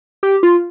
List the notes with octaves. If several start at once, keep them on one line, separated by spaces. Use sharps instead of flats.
G4
F4